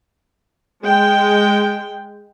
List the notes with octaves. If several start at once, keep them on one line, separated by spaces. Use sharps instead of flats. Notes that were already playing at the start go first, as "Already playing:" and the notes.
G#3 G5